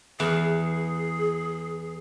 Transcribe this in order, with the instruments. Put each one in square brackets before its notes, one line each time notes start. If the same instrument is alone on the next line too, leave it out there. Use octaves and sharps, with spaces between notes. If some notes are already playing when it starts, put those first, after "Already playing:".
[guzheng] E2 [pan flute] G#4